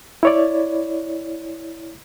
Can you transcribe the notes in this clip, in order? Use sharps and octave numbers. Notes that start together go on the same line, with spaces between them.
E4 C#5 D5